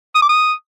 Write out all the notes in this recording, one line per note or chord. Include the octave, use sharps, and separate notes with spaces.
D#6
D6
D#6